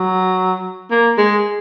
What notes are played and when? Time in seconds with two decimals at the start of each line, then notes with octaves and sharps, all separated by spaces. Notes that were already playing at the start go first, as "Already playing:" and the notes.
Already playing: F#3
0.91 A#3
1.18 G#3